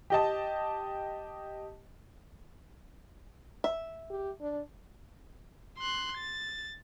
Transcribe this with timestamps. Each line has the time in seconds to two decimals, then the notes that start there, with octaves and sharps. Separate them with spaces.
0.10 G4 D#5 A5
3.64 E5
4.10 G4
4.41 D4
5.79 C6 F#6
6.17 A6